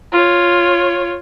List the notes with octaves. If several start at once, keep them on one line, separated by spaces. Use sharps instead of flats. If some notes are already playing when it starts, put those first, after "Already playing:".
F4 C#5